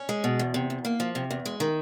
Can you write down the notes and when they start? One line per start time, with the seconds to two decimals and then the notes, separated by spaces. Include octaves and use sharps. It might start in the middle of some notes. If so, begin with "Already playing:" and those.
Already playing: C#4
0.09 G#3
0.24 B2
0.39 E2
0.54 C3
0.70 E2
0.85 A#3
1.00 F3
1.15 C3
1.31 E2
1.45 G#3
1.60 D#3